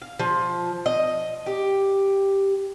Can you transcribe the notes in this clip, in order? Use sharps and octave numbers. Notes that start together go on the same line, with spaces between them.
F5
F3
D#5
G4